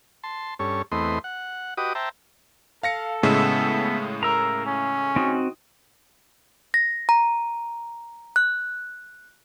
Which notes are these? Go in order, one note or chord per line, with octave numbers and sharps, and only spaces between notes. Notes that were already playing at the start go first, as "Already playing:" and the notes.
A5 C6
G2 C#4 A4 C#5
E2 A3 C4 B4 D#5 C6
F#5
F#4 G4 B4 D#5 D6 D#6
C5 E5 G5 A5 A#5
A4 F5 A#6 C#7
A2 C#3 G#3 B3 E5
A#4 A#5 E6
C#4
C4 D#4 F#4
A#6
A#5
F#6